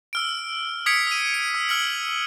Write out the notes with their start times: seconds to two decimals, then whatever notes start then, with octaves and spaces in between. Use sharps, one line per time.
0.13 E6 F6 D7
0.86 D#6 G#6 B6 C#7 D7
1.07 D#6 D#7
1.34 C#7
1.55 E6
1.69 E6 F6 B6 C#7 F#7